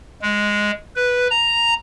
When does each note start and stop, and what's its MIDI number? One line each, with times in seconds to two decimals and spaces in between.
0.22 0.71 56
0.96 1.27 71
1.30 1.74 82